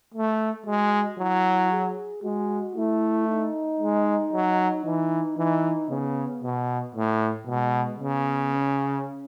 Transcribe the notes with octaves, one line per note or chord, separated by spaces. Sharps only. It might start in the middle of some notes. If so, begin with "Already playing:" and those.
A3
G#3 F#4
F#3 E4
G#4
G#3 F#4
A3 E4
D#4
G#3
F#3
E3 D#4
E3 D#4
C#3 B3
B2
A2
B2 G#3
C#3 B3
C#4